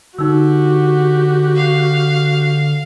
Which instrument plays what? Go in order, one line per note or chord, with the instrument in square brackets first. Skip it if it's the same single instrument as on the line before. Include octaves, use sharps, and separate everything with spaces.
[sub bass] D3 [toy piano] D#4 E6 [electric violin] F#4 G4
[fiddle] F5